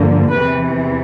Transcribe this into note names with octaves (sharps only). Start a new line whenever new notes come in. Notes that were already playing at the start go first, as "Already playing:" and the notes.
Already playing: G2 D3 F3 A#3
E2 C3 E3 B4